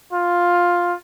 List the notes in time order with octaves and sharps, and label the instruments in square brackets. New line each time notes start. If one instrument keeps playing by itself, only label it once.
[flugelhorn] F4